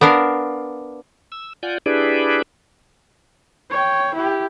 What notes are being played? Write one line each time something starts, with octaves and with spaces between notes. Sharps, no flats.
B3 D4 A#4 F5
E6
F4 D5 F#5 G#5 G6
D4 E4 G4 G#4 B4 D5
C#5 G5
E4 G4